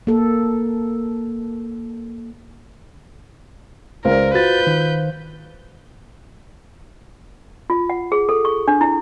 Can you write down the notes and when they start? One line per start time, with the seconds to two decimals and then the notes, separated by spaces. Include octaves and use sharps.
0.07 A#3 A4
4.05 C#2 A#4 C5 D5 F5
4.35 F4 F#4 B4 G6 A6
4.67 D#3
7.70 F4
7.90 F#5
8.12 G#4
8.29 A4
8.45 C#6
8.68 D4
8.81 E4